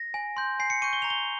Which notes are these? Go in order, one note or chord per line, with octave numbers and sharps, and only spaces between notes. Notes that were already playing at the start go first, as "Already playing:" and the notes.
Already playing: A#6
G#5
C6 G6
G#5 C7
C#7
C#6 G6 D#7
G7
A#5 F7
G7